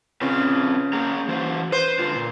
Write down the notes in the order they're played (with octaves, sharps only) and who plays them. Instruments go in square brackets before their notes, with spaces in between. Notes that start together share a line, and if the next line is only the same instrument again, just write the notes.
[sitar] C#3 [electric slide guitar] C4 F4 B4
[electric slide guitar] A#3 G#4 A#5
E3 F#4 C5
[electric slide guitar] B4 [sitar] C5
[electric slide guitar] D3 F4
A#2